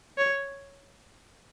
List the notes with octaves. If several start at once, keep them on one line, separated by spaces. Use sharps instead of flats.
C#5